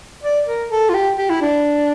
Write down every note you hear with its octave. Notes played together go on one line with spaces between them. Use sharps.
D5
A#4
A4
F4
G4
G4
E4
D4